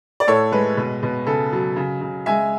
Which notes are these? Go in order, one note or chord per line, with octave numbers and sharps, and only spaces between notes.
D5
A2 A4 C#5
G#3 B4
B2
B2
C#3 A4
F#3
C#3
C#3
G#3 E5 G#5